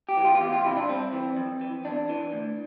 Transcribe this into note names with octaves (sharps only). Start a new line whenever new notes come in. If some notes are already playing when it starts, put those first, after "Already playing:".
G4
E3
F4
F4
E2 G4
F4
C3 F3 E4
D4
G2 C4
E3
F2
E3
E2 D4
E3
D2